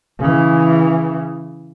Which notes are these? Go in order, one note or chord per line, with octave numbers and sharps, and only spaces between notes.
C#3 E3